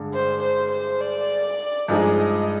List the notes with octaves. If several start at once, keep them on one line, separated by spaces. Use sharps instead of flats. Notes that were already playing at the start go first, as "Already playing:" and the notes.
Already playing: G2 D3 G#3 D4
C5
C5
C5
D5
G2 F3 G#3 D#4 G#4 D#5
D#5